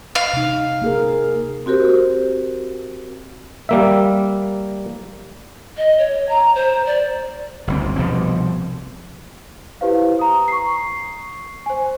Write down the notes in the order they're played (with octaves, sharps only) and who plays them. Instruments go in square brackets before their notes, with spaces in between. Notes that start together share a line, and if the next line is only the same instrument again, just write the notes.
[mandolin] F5
[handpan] C3 D#4
A#3 G#4 A#4
[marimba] C4 F#4 G4 A#4 C5
[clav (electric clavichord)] G3 A#3 E5
[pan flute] D#5
C#5
A#5
C5
D5
[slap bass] G1 D2 C4
C2 B2 F3 C4
[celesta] E4 G4 B4 C5 F5
A#5 D#6
C#6 C7
C5 G#5